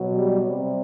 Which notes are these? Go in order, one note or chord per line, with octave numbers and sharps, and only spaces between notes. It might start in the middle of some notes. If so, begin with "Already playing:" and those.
Already playing: B2 F#3
G3
C3 G3